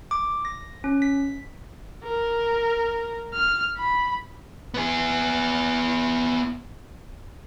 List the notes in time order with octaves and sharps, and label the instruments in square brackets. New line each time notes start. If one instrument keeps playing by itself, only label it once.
[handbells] D6
A#6
C#4
B6
[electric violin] A#4
F6
B5
[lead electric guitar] B3 G#4